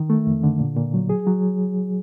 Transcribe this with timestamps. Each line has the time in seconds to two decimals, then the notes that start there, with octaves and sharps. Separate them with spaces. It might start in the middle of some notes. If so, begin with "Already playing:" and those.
Already playing: D#3
0.10 A3
0.27 F2
0.43 D3
0.59 A#2
0.76 A#2
0.94 F#3
1.09 G#4
1.27 F#3